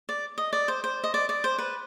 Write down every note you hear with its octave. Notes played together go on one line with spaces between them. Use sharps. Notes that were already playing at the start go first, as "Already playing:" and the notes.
D5
D#5
D5
C5
C5
D#5
D5
D5
C5
B4